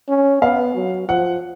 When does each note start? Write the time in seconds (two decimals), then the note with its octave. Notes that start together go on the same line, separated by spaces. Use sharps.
0.08 C#4
0.42 B3 F5
0.75 F#3
1.09 F3 F#5